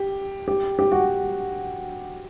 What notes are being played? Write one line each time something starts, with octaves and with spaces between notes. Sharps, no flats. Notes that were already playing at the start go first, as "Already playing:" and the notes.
Already playing: G4
G4
G4
F#4